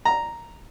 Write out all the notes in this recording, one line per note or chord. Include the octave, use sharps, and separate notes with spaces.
A#5